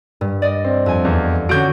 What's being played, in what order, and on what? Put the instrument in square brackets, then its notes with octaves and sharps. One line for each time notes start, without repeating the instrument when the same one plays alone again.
[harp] G2
D5 D#5
[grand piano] C4
[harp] F2 G#5
[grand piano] E2
[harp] D3 F#4 [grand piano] C#4 G6 D7